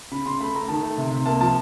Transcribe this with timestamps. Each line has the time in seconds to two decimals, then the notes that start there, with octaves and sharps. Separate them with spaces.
0.11 C#3 B5
0.26 C#3 C6
0.40 A3 B5
0.55 A3 A#5
0.68 D#3 A5
0.83 A3
0.98 C3
1.11 C3
1.26 A#3 A5
1.41 F3 A5